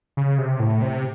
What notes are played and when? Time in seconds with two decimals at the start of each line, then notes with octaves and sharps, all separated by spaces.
0.17 C#3
0.38 C3
0.60 A2
0.82 C3